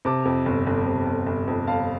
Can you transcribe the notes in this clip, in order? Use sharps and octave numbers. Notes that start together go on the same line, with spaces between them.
C3 A5 D6
F2
G1
G1
C3
G1
G1
F2
G1 F5 A5